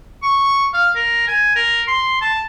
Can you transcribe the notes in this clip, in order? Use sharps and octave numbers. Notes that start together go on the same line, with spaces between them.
C#6
F5
A#4
G#5
A#4
C6
A5